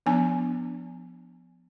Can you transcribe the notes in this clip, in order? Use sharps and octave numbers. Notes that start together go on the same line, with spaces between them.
F3 B3 D4 G#5